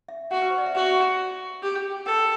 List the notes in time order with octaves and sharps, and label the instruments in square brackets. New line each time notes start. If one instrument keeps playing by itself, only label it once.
[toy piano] E5
[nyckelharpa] F#4 [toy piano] F#5
[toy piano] B4
C5
D5
E5
[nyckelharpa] F#4 [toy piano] F#5
[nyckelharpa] G4
[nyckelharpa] A4 [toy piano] G5